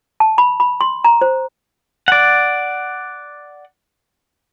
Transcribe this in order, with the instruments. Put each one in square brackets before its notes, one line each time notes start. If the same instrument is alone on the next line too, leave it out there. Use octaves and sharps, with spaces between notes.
[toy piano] A5
B5
B5
C6
A#5
C5
[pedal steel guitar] D5 F#5